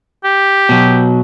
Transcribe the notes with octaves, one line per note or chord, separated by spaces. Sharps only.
G4
B2 F#3